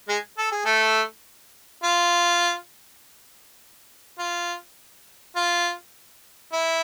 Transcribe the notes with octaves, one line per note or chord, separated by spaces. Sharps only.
G#3 G#4
A4
G#4
A3 A4
F4
F4
F4
E4